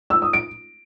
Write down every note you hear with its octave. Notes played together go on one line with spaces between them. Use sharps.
E6
D#6
D7